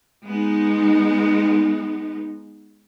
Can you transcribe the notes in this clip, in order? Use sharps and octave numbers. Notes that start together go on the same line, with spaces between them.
G#3 B3 D#4